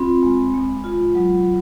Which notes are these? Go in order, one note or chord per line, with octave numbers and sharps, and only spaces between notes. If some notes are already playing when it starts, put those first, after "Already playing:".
Already playing: C4 F4 B5
G#3
G#3
F4
F#3